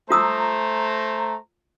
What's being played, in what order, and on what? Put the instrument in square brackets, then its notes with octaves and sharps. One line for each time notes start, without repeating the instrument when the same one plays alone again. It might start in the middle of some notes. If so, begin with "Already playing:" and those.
[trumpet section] A3 C5 A#5 [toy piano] F4 D#6 E6